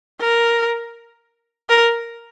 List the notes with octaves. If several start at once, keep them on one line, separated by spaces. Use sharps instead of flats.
A#4
A#4